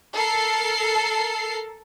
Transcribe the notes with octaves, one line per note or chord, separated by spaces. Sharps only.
A4 A#4 A5 C7